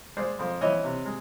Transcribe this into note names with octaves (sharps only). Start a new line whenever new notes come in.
G#3 C5 D5
F2
E3 C#5 D#5
C3
G#3